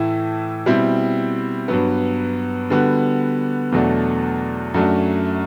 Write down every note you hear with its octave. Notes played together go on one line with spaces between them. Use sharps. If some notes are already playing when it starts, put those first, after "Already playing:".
Already playing: A2 E3 A3 E4
B2 G3 C4 E4
G2 F#3 B3
D3 G3 B3 F#4
E2 B2 F#3 A3 D4
F#2 F#3 A3 D4